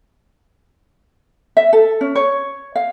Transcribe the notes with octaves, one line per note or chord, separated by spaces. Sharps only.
E5
A4
C#4
C#5
F5